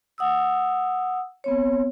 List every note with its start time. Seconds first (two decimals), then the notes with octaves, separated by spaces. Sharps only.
0.18 F#5 D#6 E6
1.44 B3 C4 C#5